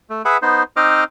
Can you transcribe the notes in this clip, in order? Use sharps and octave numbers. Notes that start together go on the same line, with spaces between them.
A3
G#4 B4 E5 F#5 B5
B3 D#4 C5
C4 D#4 C5 D#5 D6 F6